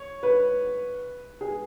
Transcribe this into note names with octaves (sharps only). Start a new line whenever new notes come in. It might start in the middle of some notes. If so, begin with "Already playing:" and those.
Already playing: C#5
B4
G#4